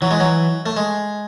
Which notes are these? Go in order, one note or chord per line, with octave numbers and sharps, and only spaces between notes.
E3 F#3
G#3
F#3
A3
G#3